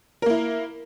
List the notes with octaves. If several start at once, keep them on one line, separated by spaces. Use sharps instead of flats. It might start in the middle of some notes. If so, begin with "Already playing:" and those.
A#3 E4 A#4